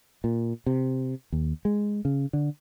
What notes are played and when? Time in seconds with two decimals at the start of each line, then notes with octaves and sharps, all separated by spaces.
0.24 A#2
0.66 C3
1.32 D#2
1.65 G#3
2.05 C#3
2.33 D3